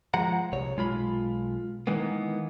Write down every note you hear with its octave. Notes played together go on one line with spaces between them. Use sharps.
F3 G#3 F#5 A#5
C2 C3 C#5
B1 G#3 F4 B5
D#3 E3 G#3 A#3 B3